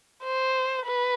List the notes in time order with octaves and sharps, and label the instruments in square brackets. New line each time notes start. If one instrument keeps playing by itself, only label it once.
[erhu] C5
B4